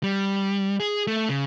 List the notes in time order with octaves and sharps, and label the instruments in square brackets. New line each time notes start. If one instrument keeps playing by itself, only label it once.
[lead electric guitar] G3
G#4
A3
C#3